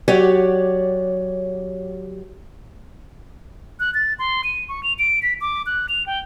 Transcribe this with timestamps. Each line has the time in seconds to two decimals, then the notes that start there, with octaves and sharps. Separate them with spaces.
0.08 F#3 G4 C#5 D5 F#5
3.80 F#6
3.94 A6
4.19 C6
4.44 D#7
4.69 C#6
4.83 F7
4.99 D7
5.23 B6
5.41 D6
5.66 F#6
5.89 F7
6.07 G5